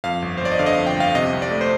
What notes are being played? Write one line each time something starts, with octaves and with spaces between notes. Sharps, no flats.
F2 F5
G1
C5
G1 D5
D#5
D3 F5
D#5
F5
F2
G5
G1 F5
C3 D#5
C2
D5
A3
C5